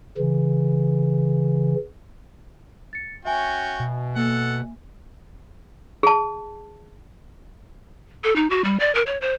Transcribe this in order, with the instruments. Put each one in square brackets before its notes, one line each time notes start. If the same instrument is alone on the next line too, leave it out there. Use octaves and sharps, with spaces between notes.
[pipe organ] C#3 E3
[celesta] A6 C#7
[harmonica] C#4 F#4 G5 [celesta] E5 G#5
[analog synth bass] B2
[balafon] A#3 [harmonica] A4 F#5
[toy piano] G#4 A5
[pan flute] A4
D#4
F#4
G3
D5
A#4
C#5
C5